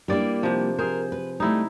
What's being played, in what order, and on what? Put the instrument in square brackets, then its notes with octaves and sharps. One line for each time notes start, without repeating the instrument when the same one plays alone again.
[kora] G2 D5 [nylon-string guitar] G3 A#3 E4
[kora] C3 F3
[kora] G#4 C5 [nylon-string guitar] A#4
[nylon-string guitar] B4
[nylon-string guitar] G3 A3 [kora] D#4 E4